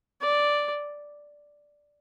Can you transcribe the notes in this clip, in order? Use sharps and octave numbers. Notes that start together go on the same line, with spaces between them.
D5